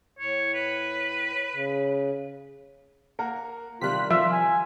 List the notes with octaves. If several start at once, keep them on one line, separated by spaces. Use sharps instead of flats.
A2 C#5
B4
C#3
A#3 A#4 F#5
C3 D#3 G3 F4 F#6 B6
F3 F4 E5
G#5